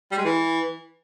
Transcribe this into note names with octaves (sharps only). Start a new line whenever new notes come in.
G3
G#3
E3